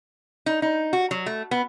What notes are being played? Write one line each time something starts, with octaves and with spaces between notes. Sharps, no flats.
D#4
D#4
F#4
F#3
A3
B3